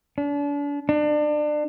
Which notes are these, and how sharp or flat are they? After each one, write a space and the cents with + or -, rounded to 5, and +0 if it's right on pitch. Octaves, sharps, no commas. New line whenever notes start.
D4 -35
D4 +30